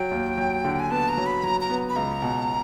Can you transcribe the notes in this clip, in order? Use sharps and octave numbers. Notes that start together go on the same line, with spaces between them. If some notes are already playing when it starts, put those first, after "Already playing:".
Already playing: F#3 G5
D#2
F#3
D3
G#5
B3 A5
A#5
F#3
B5
F#3 A#5
A#5
B3
B5
C#2 A#5
B2